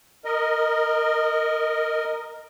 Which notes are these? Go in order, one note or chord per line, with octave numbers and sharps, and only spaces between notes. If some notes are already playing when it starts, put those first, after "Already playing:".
A#4 D#5